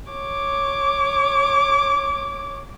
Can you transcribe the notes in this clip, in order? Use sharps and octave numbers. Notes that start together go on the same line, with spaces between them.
C#5 D6